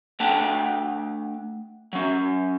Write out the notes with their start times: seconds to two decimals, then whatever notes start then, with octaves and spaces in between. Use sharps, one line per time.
0.20 A3 D4 F#5 G5 A5
1.93 F#3 C#4